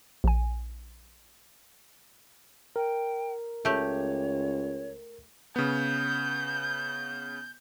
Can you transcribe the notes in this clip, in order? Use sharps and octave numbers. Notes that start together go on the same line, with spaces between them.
A#1 G#5
A#4 G5
C#2 A3 G4 C#5
C#3 B3 G6